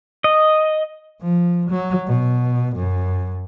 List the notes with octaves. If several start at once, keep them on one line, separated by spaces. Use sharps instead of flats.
D#5
F3
F#3
B2
F#2